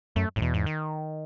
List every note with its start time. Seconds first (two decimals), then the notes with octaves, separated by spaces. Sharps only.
0.16 F#2 A3
0.36 F#2 A2
0.41 E2 B2
0.54 G#2
0.66 D#3